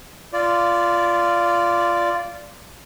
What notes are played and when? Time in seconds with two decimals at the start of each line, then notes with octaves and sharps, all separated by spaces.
0.33 F4 D5